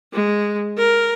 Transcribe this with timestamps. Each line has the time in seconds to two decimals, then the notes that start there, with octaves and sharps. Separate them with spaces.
0.13 G#3
0.78 A#4